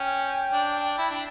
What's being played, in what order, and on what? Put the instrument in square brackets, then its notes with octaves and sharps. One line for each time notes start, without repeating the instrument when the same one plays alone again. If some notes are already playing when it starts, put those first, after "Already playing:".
Already playing: [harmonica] C#4 [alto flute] G5
[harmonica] D4
E4
D4